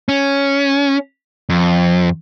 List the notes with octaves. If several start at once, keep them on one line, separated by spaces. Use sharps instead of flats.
C#4
F2